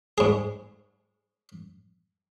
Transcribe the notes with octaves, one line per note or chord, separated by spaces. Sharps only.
G#2 G#4